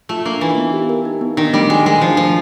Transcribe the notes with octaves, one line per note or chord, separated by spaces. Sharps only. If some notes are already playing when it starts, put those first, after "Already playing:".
A3 F4
A#3 D4
E3 D#4
B3
G4
A#4
D#4
B3
D#3 D4
G3 A3
G#3 F#4
G#3 A#4
F3 D4
F3 A3